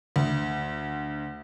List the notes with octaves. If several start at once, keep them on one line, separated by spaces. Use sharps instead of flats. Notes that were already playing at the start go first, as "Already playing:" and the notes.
D2